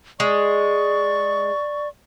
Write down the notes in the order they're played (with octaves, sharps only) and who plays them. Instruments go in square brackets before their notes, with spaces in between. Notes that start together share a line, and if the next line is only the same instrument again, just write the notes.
[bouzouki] G#3 [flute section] D5 C#6